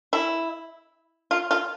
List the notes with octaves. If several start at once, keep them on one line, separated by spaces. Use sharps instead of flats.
E4
F4
F4